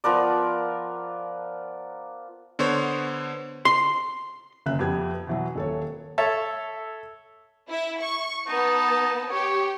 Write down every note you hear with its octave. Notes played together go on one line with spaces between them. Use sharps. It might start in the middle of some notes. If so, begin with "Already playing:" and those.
F3 B3 A#4 D5
D3 B3 C5 C#5
C6
F#1 C#3 E5 F#6
F2 B3 G4 G#6
B2 E3 F#3
D#1 A4 C#5
A4 C#5 E5 A5
E4 E5
C#6
B3 D#4 A5
G4 C#5